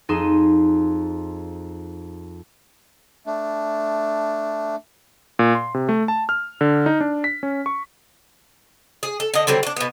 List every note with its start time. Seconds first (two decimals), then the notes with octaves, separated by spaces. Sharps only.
0.09 F2 D#4 G#4 C6 D#7 E7
3.26 A3 D4
5.39 A#2
5.55 C6
5.74 C3
5.89 A3
6.08 A5
6.29 F6
6.61 D3
6.86 D#4
7.00 D4
7.24 B6
7.43 C#4
7.66 C#6
9.03 G#4
9.20 A4
9.34 D3 D#5
9.47 D3 F#3 G3 C4
9.63 D4 F#4
9.76 B2 B3